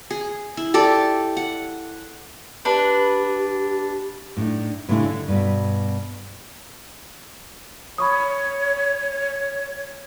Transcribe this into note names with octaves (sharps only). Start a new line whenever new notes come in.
G#4
E4
G4 A4 D5
F#5
D4 G4 B4
A2 D4 D#4
A2 C#3 G#3 D4 E4 G4
D3
G2 B2
C#5 B5 C#6 D#6